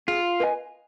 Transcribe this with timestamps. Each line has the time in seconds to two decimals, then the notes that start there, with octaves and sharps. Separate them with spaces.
0.08 F4 G#4
0.40 B4 D#5 G#5